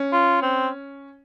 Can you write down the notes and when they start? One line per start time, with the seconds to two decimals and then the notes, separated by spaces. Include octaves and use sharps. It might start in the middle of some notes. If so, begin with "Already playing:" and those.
Already playing: C#4
0.12 F4
0.42 C4